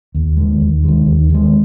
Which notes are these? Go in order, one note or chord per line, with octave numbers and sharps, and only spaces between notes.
D#2
D#3 G#3
D#2
D#3 G#3
D#2
D#3 G#3